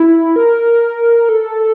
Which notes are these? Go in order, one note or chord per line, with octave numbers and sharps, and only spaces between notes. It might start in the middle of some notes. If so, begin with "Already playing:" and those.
Already playing: E4
A#4
A4